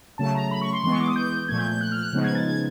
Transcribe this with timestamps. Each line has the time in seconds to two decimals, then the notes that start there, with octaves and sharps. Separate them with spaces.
0.18 C#3 F#3 A3 A5
0.35 A#5
0.51 B5
0.62 C#6
0.73 C6
0.84 E3 G#3 B3 C6
0.92 C#6
1.00 D6
1.08 D#6
1.16 G6
1.48 A#2 F3 A3 G#6
1.59 G6
1.71 G6
1.81 F#6
1.92 F6
2.02 F#6
2.13 C#3 F3 G#3 B3 D#4
2.24 G#6
2.35 A6
2.46 G#6